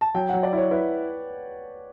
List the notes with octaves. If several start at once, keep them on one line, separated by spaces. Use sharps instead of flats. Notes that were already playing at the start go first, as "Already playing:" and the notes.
A5
F#3 G5
F#3 F#5
D5
E4 C#5
E4 B4